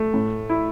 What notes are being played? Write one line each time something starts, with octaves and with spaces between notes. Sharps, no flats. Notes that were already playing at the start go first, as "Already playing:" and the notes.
Already playing: A3
A2
E4